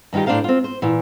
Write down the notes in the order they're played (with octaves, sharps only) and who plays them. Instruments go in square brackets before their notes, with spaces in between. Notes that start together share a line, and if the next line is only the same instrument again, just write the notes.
[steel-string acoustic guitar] G2 D#3 D#4 F4 G4
A2 D4 A#4 C5 F5 A#5
C4 F4
C5
A#2 E3